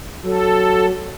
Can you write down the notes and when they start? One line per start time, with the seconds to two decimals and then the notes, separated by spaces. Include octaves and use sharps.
0.25 F#3 A4